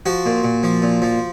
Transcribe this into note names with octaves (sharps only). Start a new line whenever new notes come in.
F3 F#4
A#2
A#2
F3
A#2
F3